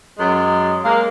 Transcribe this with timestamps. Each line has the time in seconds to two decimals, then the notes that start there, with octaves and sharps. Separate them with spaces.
0.17 F#2 F#3 G#3
0.84 G#3 A#3